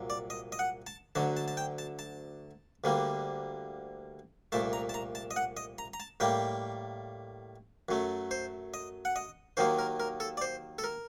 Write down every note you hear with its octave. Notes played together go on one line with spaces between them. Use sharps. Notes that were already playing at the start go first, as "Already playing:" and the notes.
Already playing: C2 A#2 F#3
D5
D#5
D#5
F#5
A5
D2 D3 F#3 A5
A5
A5
G5
A5
A5
D2 D3 G3 A#3
C2 A#2 A3 A5
A#5
A5
A#5
A5
D#5
F#5
D#5
A#5
A#5
A5
A2 G3 A#3 G5
F#2 F#3 A3
C5
D#5
F#5
D#5
D#2 D#3 F#3 A#3 C5
A#4
A#4
A4
D5
C5
A4
A#4